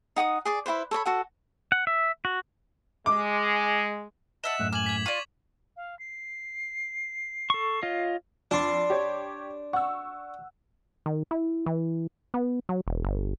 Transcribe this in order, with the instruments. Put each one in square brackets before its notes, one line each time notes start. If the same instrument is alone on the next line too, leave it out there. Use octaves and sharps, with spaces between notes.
[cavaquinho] D#4 F#5 G5 D#6
G#4 D5 D6
E4 F4 B4 C5
A4 C#5 D5 B5
F#4 A4 F#5
[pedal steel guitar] F#5
E5
F#4
[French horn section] G#3 [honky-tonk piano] D6
[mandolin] D#5 E5 F#5 [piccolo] A5 [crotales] E7
[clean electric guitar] F#2 A2 [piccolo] F#6
[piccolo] G#5 [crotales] D6 F#7 [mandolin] F6
[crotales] G#6 B6
[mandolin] F4 D5 [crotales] C#6 [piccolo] D#7
[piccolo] F5
C7
[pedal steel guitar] A4 C#6
F4 C#5 D#5
[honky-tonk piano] F2 [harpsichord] D4 [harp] A5 C6
[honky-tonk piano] G4 C#5
[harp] F#5 [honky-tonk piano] C#6 E6
[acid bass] D#3
E4
E3
B3
F#3
E1
G1